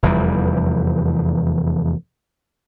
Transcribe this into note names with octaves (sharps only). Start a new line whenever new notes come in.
F1 E2 E3 G3